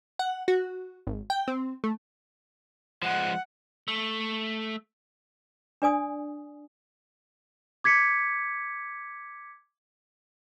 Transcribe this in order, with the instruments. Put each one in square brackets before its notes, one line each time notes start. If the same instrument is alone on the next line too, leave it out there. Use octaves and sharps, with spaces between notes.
[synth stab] F#5
F#4
G#1
G5
C4
A3
[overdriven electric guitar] F3 G#3 [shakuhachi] F#5
[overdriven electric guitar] A3
[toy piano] D4 D5 G#5 D#6
[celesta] D6 G#6 B6 C#7